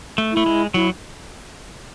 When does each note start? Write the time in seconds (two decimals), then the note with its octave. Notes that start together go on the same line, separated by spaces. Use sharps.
0.18 A3
0.32 A3 E4
0.46 G#3
0.74 F#3 E4